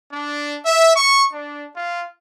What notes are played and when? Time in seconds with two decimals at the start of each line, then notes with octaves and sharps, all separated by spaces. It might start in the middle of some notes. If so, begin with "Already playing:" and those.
0.12 D4
0.65 E5
0.97 C#6
1.33 D4
1.76 F4